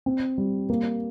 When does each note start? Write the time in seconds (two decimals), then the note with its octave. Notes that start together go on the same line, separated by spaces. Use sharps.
0.06 C4
0.38 G3
0.70 A#3